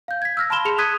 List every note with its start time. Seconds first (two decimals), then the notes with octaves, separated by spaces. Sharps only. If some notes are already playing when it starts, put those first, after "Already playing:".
0.08 F5 G6
0.22 G#6 B6
0.37 E6 F6 A#6
0.50 A5 B5 C6 E7 G7
0.65 G#4 A5 C6 C#7 F7
0.78 D#6 F#6 G#6 B6 D#7